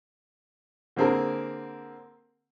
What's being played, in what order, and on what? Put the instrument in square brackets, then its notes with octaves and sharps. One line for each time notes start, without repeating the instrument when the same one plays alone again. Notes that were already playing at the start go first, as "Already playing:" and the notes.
[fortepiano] D3 A#3 C4 G#4 A#4